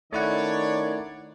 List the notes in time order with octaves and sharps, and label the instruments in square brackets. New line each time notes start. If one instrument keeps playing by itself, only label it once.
[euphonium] D#3 [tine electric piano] A3 E4 F#5 [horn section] C#4 D4 D5 [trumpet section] C#5